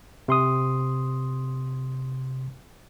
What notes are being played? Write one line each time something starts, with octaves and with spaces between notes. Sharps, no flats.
C3 C6 D#6